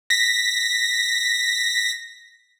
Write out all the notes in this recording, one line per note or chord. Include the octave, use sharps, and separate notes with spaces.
A#6 B6